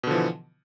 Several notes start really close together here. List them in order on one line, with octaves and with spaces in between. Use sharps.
B2 D3 F3 E3